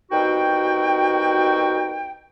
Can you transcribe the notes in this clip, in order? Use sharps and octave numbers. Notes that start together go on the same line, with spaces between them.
C2 B2 D#4 F#4 G5